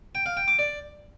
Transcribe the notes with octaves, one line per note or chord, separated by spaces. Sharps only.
G5
F5
G5
D6
D5